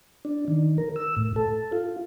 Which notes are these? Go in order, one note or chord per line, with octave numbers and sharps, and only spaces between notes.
D4
D#3
A#4
E6
A2
A4
F4